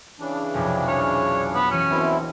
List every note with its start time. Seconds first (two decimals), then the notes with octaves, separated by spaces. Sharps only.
0.20 C#3 E3 D4
0.54 B1 F2 C3
0.88 G#4 C#5 B5 F6
1.55 B3
1.71 E3 C#4 F#4 C#7
1.90 E1 B2 C4 E4